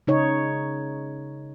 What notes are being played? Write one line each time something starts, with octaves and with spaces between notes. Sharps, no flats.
C#3 D#4 C#5